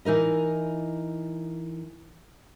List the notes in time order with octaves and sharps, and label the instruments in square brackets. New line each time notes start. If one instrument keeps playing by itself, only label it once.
[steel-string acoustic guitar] E3 D#4 A#4 D#5